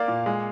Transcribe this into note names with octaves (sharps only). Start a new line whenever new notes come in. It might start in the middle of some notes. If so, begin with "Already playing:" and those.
Already playing: A#3 D5 F5
A#2
G#3